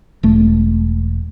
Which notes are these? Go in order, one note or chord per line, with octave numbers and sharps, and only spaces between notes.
E1 A3